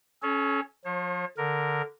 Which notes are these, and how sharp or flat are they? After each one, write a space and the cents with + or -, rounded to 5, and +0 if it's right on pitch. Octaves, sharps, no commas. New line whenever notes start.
C#4 +0 A4 -40 C#5 +0
F3 +30 C#5 -45
D3 +0 A#4 +0